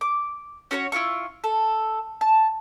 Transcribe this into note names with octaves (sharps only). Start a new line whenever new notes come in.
D6
C#4 F#4 C5 C#5
E4 F4 F5 C#6
A4
A5